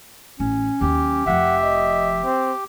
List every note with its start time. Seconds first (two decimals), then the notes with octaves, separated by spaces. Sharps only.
0.40 A1 C#4
0.81 D#2 F#3 G4
1.26 F1 F3 E5 F#5
1.62 D#5
2.24 C4